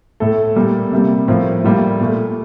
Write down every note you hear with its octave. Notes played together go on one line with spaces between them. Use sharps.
A2 A3 A4
A#2 G3 A#3
C3 G3 A#3
A2 F3 A#3
A2 G3 A#3 F4
A#2 A3